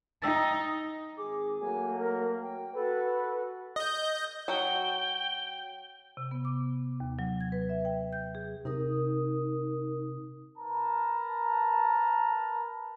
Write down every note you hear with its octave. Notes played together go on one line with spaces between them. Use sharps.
D#4 G5 E6 A6
G#1 G#4 D6
F#3 A3 A#3 G#5
A#4
G5
F#4 A4 B4
D#5 G6
F#3 F#4 G5
C3
B3
D6
D#2
F#3
G#6
B4
E5
G5
G6
G#4
C3 D#4 A#4 D#6
A#4 B4 A5 A#5